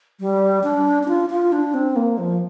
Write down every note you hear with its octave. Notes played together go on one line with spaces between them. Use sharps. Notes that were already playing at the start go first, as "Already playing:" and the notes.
G3
D4
D4
F4
F4
D4
C4
A#3
F3